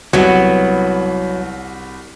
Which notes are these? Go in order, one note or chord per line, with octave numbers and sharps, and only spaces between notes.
C2 F#3 B3 F#4